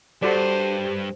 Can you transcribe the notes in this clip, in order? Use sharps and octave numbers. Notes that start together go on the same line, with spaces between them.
G2 F#4 G4 A4 C5 D5